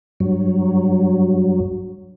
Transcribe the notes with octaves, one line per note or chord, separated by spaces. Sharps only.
G2 F#3